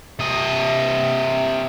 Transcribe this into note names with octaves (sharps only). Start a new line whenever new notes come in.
C3 D#5